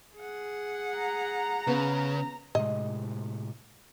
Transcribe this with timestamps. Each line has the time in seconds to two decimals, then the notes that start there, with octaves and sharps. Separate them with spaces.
0.16 G#4 F#5
0.96 A#5
1.67 C#3 B3
2.55 A2 C3 G#3 D#5